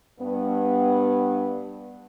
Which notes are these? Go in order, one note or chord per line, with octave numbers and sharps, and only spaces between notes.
G2 B3